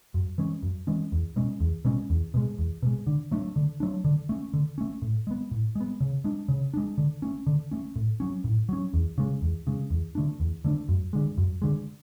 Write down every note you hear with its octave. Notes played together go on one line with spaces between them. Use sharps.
F#2
E3 G#3 C#4
F#2
E3 G#3 C#4
E2
B2 G#3 C#4
E2
B2 G#3 C#4
E2
B2 G#3
E2
B2 G#3
D3
F#3 A3 D4
D3
F#3 A3 D4
D3
A3 C#4
D3
A3 C#4
A2
G#3 B3
A2
G#3 B3
C#3
G#3 D4
C#3
G#3 D4
D3
A3 C#4
D3
A3 C#4
A2
F#3 C#4
A2
F#3 C#4
E2
C#3 G#3
E2
C#3 G#3
E2
D3 A3 D4
E2
D3 A3 D4
F#2
D3 G#3
F#2
D3 G#3